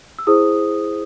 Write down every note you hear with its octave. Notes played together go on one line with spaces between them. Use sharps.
E6
E4 G#4 C5 D#6